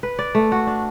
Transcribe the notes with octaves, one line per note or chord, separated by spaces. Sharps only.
B4
D5
A3
F#4
D4